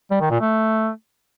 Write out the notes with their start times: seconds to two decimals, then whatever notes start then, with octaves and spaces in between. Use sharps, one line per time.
0.11 G3
0.21 D#3
0.31 A#2
0.41 A3